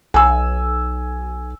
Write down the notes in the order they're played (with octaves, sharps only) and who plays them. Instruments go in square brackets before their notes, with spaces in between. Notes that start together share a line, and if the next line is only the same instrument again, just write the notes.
[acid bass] B1 [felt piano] G#5 E6